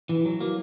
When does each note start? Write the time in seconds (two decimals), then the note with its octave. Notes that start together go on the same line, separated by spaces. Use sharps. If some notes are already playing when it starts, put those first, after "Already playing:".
0.09 E3
0.25 F#3
0.40 A#3